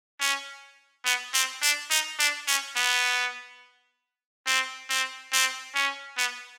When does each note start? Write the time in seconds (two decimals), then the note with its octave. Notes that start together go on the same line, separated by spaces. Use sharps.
0.20 C#4
1.05 B3
1.34 C4
1.62 D4
1.90 D#4
2.19 D4
2.47 C#4
2.76 B3
4.47 C4
4.89 C4
5.32 C4
5.75 C#4
6.17 B3